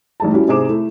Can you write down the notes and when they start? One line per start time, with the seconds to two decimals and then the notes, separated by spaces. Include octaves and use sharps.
0.20 A1 G#2 A5
0.33 G3 C#4 E4 F#4
0.48 G#2 C3 G#4 C5 D6 E7
0.69 A3 E4